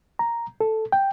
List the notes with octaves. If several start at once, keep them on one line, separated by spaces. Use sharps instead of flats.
A#5
A4
G5